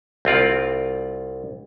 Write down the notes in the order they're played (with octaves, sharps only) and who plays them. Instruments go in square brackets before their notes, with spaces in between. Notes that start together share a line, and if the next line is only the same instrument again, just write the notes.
[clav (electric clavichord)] C2 C4 F4 D5